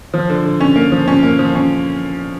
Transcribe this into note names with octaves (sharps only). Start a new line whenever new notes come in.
F3
D3
D3
C#4
A#3
F3
C#4
A#3
F3
C#4